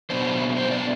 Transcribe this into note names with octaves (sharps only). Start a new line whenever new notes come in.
B2 F#3 B3 D4 C5
C5
D5